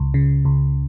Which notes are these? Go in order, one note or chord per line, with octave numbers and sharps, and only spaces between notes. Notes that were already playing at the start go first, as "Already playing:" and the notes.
Already playing: C#2
C#3
C#2